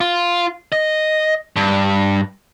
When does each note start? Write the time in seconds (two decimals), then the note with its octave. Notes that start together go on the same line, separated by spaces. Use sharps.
0.01 F4
0.72 D#5
1.56 G2